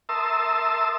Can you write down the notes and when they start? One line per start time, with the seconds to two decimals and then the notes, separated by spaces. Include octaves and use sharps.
0.09 A#4 E5 A5 C6 D#6 E6